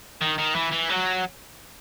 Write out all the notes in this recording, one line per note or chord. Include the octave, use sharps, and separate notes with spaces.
D#3
D#3
E3
E3
F#3